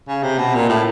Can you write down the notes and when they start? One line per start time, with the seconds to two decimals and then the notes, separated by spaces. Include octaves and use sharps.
0.08 C#3
0.23 C3
0.39 B2
0.55 A#2
0.69 A2